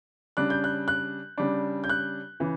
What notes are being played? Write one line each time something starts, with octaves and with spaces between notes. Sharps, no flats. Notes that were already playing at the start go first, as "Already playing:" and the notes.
C#3 G3 D4 F#6
G6
F#6
F#6
C#3 G3 D4
G6
F#6
C#3 E3